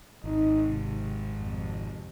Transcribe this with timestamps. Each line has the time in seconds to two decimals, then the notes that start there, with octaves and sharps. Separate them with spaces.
0.24 G#1 D#4
0.67 G#2 C3
1.31 F2 C3